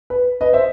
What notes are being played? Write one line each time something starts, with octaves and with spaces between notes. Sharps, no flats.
B4
B4 D#5
C5 E5